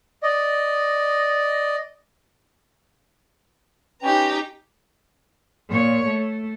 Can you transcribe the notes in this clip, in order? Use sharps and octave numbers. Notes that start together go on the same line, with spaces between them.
D5 D#5
C#4 D#4 G4 B4 G5 A#5
A#2 C#5
A3